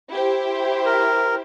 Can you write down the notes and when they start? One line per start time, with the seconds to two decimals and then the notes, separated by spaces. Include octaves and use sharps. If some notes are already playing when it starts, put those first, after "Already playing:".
0.11 E4 G4 C5
0.86 A#4